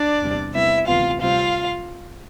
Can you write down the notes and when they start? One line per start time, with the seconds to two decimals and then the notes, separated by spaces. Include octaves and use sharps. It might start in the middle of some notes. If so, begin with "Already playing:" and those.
Already playing: D4 D5
0.22 E2 C3 G3
0.55 C3 G3 B3 E4 E5
0.87 D2 C3 E3 B3 F4 F5
1.20 C3 G3 C4 F4 F5